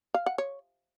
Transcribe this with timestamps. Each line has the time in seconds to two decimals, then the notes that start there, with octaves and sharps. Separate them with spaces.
0.14 F5
0.26 F#5
0.38 C#5